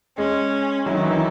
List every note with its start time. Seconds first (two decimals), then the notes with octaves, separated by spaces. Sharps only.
0.17 G#3 C#4
0.86 F#3 E4
0.95 D#3
1.03 E3
1.11 D#3